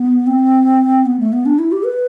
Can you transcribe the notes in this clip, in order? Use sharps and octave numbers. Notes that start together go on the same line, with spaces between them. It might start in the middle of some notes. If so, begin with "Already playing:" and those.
Already playing: B3
C4
B3
A3
B3
D4
E4
G4
B4